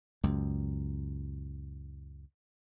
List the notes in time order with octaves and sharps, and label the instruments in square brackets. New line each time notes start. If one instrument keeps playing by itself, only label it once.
[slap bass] C#2 F#2